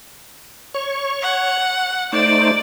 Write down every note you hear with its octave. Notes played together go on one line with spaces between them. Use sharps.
C#5 C#6
F#5
A3 D#4 C5 D5